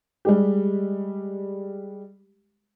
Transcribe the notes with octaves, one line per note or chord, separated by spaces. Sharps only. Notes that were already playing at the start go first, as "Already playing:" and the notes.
G3 G#3 G4